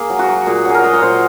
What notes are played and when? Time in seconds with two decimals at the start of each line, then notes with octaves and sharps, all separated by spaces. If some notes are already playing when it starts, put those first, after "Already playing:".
Already playing: A#3 G#4
0.10 F#3
0.19 F#4
0.28 F#3
0.47 A#2 G#4
0.65 F#3 G#4
0.74 A#4
0.84 F#3 D#5
0.93 C#5
1.02 A#2 C5